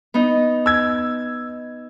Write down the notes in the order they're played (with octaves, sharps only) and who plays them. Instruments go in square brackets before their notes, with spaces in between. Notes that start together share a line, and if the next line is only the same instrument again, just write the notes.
[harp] B3 D#4
[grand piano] E6 G#6